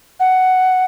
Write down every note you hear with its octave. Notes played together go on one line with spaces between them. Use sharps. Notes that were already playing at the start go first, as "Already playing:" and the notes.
F#5